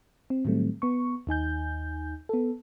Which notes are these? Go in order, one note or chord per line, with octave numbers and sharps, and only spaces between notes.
C4
A2 D#3 F#3 G3 A3 C4
B3 C#6
D#2 D#4 G#5 G6
B3 A4